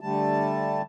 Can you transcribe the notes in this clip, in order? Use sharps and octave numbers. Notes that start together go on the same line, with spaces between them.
D3 G3 A3 A5